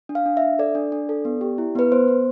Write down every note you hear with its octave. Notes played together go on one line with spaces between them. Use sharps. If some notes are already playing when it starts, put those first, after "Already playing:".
D4
F5
D4
E5
D4
A4 D5
D4
D4
A4
B3
G4
E4
B3 B4
B3 C5
B3